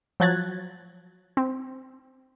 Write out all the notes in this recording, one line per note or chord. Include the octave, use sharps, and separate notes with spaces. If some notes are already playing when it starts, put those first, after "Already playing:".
F3 F#3 F#6 G#6 A6
C4